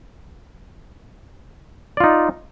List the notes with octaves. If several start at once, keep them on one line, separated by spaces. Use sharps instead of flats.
D#4 F4 D5